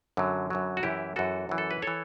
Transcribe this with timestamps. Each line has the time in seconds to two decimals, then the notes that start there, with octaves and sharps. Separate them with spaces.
0.17 F#2 D3 F#3
0.50 F#2 D3 F#3
0.77 F#4
0.83 F#2 E3 E4 G4
1.16 F#2 E3 F#4 A4
1.49 F#2 E3
1.58 A4
1.71 B4
1.82 E3 A4 C#5